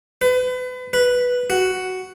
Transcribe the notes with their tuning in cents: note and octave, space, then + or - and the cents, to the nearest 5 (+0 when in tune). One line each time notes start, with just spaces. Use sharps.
B4 +35
B4 -5
F#4 +5